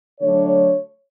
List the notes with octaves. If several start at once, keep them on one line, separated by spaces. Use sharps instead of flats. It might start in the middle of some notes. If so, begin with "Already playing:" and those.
D3 F#3 A3 D4 C#5